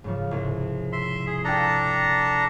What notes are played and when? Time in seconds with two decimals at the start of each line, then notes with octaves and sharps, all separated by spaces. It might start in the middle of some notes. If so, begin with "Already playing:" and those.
0.04 G#2 C#3 F3
0.31 C2 G#2 C3
0.92 E5 C6
1.27 G#4
1.44 D4 F4 A4 G5 A#5